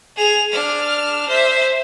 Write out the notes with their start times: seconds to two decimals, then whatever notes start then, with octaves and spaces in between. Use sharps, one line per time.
0.16 G#4 F7
0.52 D4 F6
1.28 C5 E5